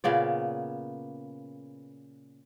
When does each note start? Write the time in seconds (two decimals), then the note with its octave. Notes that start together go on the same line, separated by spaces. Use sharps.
0.04 A#2 C#3 B3 D5